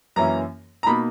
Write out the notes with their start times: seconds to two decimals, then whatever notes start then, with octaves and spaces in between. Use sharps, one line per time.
0.16 F#2 E3 A#3 C#4 E4 A#5
0.83 A#5
0.86 B2 A#3 D#4 B5